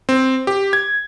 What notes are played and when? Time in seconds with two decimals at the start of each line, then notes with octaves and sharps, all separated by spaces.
0.09 C4
0.47 G4
0.73 G#6